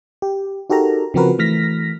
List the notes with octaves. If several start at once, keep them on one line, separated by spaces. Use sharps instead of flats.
G4
D#4 F#4 G4 A4 A#4 A#5
C#3 F3 C4 F#4 A#4 B4
E3 A3 F6 A#6 B6